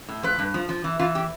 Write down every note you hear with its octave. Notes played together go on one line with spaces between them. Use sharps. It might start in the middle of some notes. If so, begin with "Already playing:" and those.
A2
F3 B4
G2
F3
F3
E3
E3 F4
G4